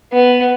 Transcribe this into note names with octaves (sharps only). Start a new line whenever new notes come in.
B3